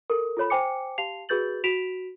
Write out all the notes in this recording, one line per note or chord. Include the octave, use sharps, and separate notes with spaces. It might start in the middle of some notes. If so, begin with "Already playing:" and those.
A4 A#4
F4 A4 C#5 B5
C5 G5 G#5 D6 C#7
G4 F5 A5 C7 F7
F#4 G#4 B4 G6 A6 F#7
F#4 B6 D7 E7 F7